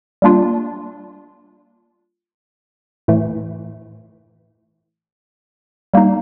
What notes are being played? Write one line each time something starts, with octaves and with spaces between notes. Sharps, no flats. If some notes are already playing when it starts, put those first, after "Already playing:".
G3 A#3 D4 F4
A2 E3 A3
G3 A#3 D#4